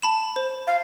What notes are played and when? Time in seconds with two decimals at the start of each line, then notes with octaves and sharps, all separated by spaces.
0.02 A5 B5 E7
0.36 C5
0.67 F5